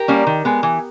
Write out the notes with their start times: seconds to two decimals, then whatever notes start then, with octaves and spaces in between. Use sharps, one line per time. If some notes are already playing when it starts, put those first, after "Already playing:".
Already playing: G4 A#4
0.08 G3 A#3 C#4
0.27 D#3
0.45 G#3 B3
0.63 E3